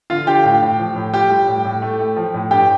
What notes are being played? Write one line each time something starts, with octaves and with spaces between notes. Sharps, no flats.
D3 F4 F5
D3 G4 G5
A2
A2
F3
A2
F4 G4 G5
G3
A2
A2
A3
A3
F3
A2
G2 G4 G5